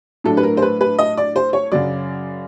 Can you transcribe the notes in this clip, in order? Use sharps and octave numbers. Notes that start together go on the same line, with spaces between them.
A2 F#3 A3 D4 A4
B4
A#4
C5
B4
B4
D#5
D5
C5
C#5
F#2 C#3 F#3 D5